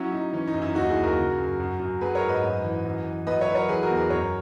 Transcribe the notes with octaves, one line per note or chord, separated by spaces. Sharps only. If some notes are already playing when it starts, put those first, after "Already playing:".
Already playing: F#3 C#4 E4
F#3 D#4
E3 C#4
D#4
F#2
C#4 E4
D#2 D#4 F#4
E4 G#4
D#2
F#4 A#4
C#3
F#2
F#2
F#2
F#3 G#4 B4
A#4 C#5
G#2
B4 D#5
F#2
E3
F#2
E3
F#3 B4 D#5
C#5 E5
F#3 B4
A#4 C#5
E3 G#4 B4
F#4 A#4
E2
G#4 B4
F#2 A#4 C#5